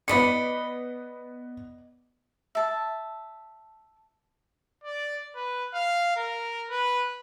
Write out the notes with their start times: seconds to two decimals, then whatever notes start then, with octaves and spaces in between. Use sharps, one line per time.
0.08 B3 D5 D#5 B5 B6 C#7
2.55 E5 A5
4.84 D5
5.36 B4
5.74 F5
6.17 A#4
6.71 B4